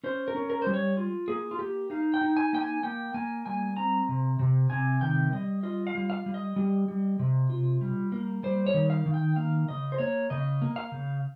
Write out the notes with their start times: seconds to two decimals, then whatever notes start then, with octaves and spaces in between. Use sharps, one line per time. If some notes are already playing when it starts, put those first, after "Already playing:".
0.04 C#4 C5
0.28 A#4
0.35 C#4
0.50 A#4
0.62 G3 C5
0.74 C#5
0.97 F4
1.28 A#3 G#4
1.51 F4
1.59 A#3 G4
1.90 D#4 F5
2.14 G5
2.21 D#4
2.37 G#5
2.53 A#3 G5
2.61 G#5
2.83 A#3 G5
3.14 A#3 G#5
3.46 G3 G#5
3.77 C4 A#5
4.09 C3
4.39 C3
4.70 C3 G#5
5.01 D#3 G5
5.32 G3 D#5
5.63 F4 D#5
5.87 F5
5.95 G3
6.10 F5
6.26 G3
6.34 D#5
6.56 G3
6.88 G3
7.19 C3
7.50 F4
7.81 G3
8.12 A#3
8.43 G3 C5
8.67 C#5
8.74 D#3
8.90 F5
9.06 D#3
9.14 G5
9.36 A#3 F5
9.68 C#3 D#5
9.92 C5
9.98 A#3 C#5
10.30 C#3 D#5
10.62 A#3
10.76 F5
10.92 C#3